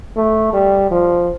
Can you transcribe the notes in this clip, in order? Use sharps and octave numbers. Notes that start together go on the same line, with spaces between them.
A3
G3
F3